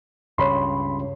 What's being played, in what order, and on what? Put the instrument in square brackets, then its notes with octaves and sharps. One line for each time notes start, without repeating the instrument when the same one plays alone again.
[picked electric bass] C#2 G2 C#3 [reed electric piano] C#5 B5 C6